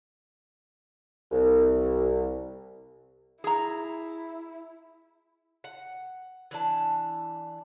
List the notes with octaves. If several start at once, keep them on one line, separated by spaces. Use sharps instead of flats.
C2
E4 G#4 A#5
F#5
E3 D4 A5